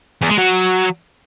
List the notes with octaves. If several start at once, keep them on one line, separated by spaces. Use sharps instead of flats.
E2
G#3
F#3